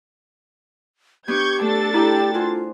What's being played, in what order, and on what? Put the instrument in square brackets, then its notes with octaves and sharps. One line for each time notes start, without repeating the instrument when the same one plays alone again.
[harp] B3 D4 [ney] G4 [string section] C#6 G6 G#6
[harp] A3 [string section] D4 A4 A6
[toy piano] E4 A#5 [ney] G4 [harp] B4 D5 G5
[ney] F4 [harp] F#4 G#4 C5